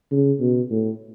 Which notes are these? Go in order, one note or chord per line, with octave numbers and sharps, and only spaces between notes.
C#3
B2
A2